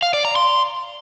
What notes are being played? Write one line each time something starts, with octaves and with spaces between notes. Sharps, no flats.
F5
D5
A#5
C6